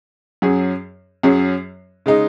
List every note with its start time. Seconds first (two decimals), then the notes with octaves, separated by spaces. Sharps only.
0.42 F#2 F#3 C#4 G#4
1.23 F#2 F#3 C#4 G#4
2.06 C#3 G#3 D#4